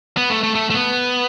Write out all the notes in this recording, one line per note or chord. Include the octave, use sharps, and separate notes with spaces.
B3
A3
A3
A3
A3
B3